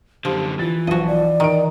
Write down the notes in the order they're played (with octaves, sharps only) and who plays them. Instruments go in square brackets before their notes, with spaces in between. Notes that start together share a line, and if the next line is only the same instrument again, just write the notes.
[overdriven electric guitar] F#2 D3 [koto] F3 [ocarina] G4
[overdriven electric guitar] E3 [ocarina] F4 [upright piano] A6
[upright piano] B1 F3 [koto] F#4 D#5
[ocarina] D5
[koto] D#3 [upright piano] A#5 D7